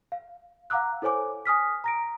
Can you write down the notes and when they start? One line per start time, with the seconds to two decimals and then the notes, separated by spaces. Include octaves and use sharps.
0.12 F5
0.70 F5 F#5 A#5 D6 E6 F#6
1.02 E4 A4 C5 C#5 G#5 D6
1.46 G#5 D#6 F6 B6
1.84 A#5 A#6 D7